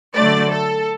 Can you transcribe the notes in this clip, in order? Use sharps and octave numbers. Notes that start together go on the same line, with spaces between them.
D3 F#3 A3 D5
A4